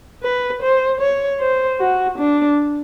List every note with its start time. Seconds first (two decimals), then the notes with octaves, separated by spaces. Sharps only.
0.23 B4
0.62 C5
1.01 C#5
1.40 C5
1.80 F#4
2.19 D4